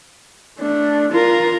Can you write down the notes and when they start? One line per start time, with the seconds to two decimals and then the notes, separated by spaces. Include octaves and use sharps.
0.60 A3 D4
1.12 F4 A#4